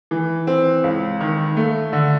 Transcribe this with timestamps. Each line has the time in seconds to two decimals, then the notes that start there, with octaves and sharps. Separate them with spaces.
0.11 E3
0.47 C4
0.84 C#2
1.21 D#3
1.57 A3
1.93 D3